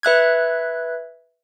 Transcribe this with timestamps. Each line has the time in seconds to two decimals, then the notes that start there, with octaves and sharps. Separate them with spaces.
0.03 B4 E5 F#6 G#6